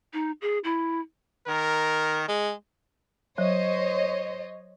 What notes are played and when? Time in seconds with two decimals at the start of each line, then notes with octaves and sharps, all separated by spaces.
0.13 D#4
0.42 G#4
0.64 E4
1.48 D#3 A#4
2.28 G#3
3.38 F#3 C5 C#5 D#5